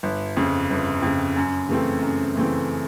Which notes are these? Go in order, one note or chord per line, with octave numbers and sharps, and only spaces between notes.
G1
F2 C#3
G1
F2 C#3
F#2
C#3 E3 A3 C4
F#2
C#3 E3 A3 C4